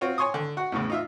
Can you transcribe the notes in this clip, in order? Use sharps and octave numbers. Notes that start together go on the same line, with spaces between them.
C4 F4 F#4 C#5
C#5 G#5 C6 C#6 D#6
D3
F#4 F#5
E2 A2 C#3
D#4 F4 E5